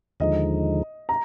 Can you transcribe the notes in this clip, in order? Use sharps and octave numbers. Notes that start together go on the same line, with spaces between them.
D#2 D3 F3 G#3 D#4 D#5
A#5